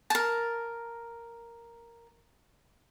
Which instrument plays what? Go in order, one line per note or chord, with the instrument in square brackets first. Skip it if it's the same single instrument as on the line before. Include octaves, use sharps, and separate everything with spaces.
[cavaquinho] A#4 A5